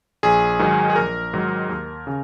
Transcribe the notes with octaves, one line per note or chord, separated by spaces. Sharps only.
A#1 G#4
G#2 D#3 F#3
G#4
A#1 A#4
G#2 D#3 F#3
D#2
C#3